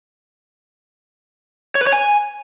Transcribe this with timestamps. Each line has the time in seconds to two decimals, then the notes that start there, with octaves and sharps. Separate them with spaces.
1.75 C#5
1.81 B4
1.87 C#5
1.93 G#5